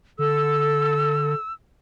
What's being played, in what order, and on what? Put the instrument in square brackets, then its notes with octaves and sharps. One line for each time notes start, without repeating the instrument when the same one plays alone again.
[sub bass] D3 [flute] A4 [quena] E6